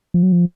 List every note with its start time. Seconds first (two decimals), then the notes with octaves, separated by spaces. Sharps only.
0.14 F3
0.23 F#3
0.32 F3